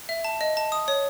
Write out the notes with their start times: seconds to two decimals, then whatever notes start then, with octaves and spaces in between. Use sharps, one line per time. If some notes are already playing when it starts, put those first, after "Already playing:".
0.09 E5
0.24 A5
0.41 D#5
0.57 A5
0.72 D#6
0.88 C#5